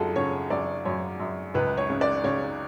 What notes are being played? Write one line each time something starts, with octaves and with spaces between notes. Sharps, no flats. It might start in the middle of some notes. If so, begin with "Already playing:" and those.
Already playing: F#2 C#3 D4 F4 F#4 G#4 A4
C#3 C#5
F#2 D5
F#2 C#5
F#2
C#2 B4
C#5
C#3
D5
C#3 C#5